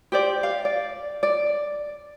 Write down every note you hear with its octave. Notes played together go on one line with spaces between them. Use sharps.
G4 C5 D5
F5
D5
D5